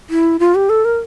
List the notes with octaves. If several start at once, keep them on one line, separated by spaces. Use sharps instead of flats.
E4
F4
G4
A4
A#4